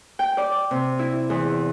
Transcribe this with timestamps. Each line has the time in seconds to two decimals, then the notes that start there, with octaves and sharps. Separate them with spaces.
0.19 G5
0.37 D5
0.71 C3
0.99 E4
1.30 E2